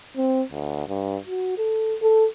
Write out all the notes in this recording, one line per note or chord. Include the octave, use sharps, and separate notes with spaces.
C4
D2
G2
F#4
A4
A4